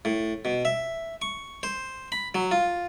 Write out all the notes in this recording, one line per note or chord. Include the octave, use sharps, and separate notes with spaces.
A2
B2
E5
C#6
C5
B5
F#3
F4